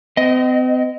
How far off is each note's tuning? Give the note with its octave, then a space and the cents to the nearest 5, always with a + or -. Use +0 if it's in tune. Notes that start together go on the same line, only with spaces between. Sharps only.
C4 -45 D#5 -10